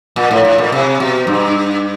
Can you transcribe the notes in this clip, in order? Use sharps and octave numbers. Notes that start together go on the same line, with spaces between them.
A#2
A2
A2
A#2
C3
B2
G2